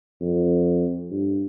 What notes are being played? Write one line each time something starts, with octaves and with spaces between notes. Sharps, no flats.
F2
G2